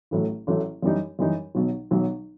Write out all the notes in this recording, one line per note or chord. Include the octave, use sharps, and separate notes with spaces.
A1 A2 F#3 A3
A1 A2 F#3 A3
F#2 E3 G3 D#4
F#2 E3 G3 D#4
B1 B2 F#3
B1 B2 F#3